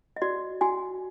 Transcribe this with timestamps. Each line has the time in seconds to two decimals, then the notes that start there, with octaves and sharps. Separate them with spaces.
0.16 D#5
0.22 F#4 D5
0.61 F#4 G#5